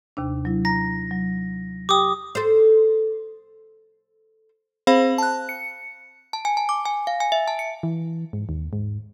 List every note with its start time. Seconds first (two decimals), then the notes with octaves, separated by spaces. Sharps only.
0.17 D#2 C3 D4
0.45 F#3 E4
0.65 A#5 A#6
1.11 F#3
1.89 G4 G5 D6 D#6
2.35 A4 C5
4.87 C4 G#4 C5 F5 B5
5.18 A5 F#6
5.49 C#7
6.33 A5
6.45 G#5
6.57 A5
6.69 D6
6.86 G#5
7.07 F5
7.20 G#5
7.32 E5
7.48 A5
7.59 C#7
7.83 E3
8.33 G#2
8.49 D#2
8.73 G#2